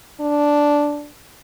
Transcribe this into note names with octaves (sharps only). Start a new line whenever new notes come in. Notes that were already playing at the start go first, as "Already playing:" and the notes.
D4